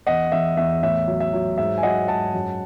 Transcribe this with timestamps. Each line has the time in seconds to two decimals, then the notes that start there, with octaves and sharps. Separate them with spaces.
0.07 E2 D#5 F#5
0.32 E2 E5
0.57 E2 E5
0.83 A2 E5
1.07 F#3
1.20 E5
1.33 F#3
1.58 G#2 E5
1.78 G#5
1.83 F#3 D#5 F#5
2.08 G#2 F#5 A5
2.34 F#2